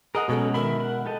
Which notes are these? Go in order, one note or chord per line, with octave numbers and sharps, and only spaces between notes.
G#4 A#4 D#5 F#5 D#6
B2 F#3 G#3 C#4 A4
D#3 A#4 E5 B5
F#5
G4 A4 D#5